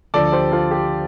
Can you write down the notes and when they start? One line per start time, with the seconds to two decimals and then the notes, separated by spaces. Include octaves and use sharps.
0.14 D2 D3 F3 A4 D5
0.32 G4 C5
0.52 F4 A4
0.71 G4